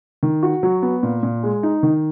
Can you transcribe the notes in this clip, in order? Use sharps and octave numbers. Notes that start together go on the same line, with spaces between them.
D#3
F#4
F#3
B3
A#2
A#2
G#3
D#4
D#3